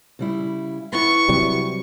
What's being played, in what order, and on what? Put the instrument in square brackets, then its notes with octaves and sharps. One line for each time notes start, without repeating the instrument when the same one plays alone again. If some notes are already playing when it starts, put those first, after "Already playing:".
[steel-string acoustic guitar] C#3 G3 E4
[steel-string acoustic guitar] B3 E4 [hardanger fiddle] C#6
[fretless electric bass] C3 F#3 G3